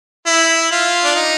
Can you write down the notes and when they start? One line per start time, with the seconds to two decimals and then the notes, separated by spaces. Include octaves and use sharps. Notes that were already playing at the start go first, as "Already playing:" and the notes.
0.26 E4
0.72 F4
1.04 D4
1.15 D#4